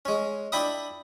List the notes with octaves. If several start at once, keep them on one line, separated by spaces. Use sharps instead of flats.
G#3 C#4
D4 E4 G5 B5 D#6